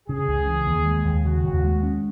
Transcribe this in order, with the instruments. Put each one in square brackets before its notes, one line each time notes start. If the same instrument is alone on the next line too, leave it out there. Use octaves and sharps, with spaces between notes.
[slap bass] C#3 [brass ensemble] G#4
[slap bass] C#2
E3
D#2
G#3
D#2
[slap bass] C#3 [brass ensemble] F#4
[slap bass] D#2
G#3
C#4